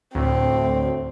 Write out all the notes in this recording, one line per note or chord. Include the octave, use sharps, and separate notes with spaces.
D2 A2 C4